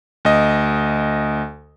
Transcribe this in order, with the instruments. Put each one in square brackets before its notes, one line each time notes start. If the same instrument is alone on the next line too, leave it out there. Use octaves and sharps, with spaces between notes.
[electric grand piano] D2 D#5